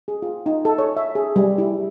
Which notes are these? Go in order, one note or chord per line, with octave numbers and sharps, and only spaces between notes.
G#4
F4
D#4
A4
C#5
E5
G#4
G3
E4